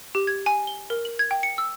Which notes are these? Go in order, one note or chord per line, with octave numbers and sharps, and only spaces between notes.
G4
G#6
G#5
G7
A#4
F#7
G#6
G5
C#7
E6